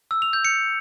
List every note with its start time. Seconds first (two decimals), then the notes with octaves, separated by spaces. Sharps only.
0.11 E6
0.22 F7
0.33 G6
0.45 C#7